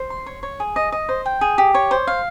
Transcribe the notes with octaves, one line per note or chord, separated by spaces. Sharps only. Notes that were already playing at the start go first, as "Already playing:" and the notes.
Already playing: C5
C6
C#5
C#5
G#4
D#5
D#5
C5
G5
G#4
G4
C#5
C5
F5